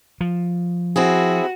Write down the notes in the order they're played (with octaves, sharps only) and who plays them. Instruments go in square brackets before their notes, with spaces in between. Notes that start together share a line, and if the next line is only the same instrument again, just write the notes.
[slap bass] F3
[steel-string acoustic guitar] C4 E4 G#4 [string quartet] F#4